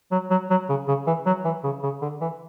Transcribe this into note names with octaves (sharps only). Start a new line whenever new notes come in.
F#3
F#3
F#3
C#3
C#3
E3
F#3
E3
C#3
C#3
D3
E3